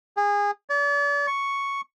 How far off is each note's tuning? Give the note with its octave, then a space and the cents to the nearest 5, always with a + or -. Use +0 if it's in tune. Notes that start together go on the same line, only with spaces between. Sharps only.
G#4 -25
D5 -40
C#6 +0